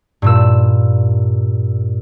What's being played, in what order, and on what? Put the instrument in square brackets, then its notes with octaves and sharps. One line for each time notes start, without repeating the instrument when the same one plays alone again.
[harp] G2 A#2 E6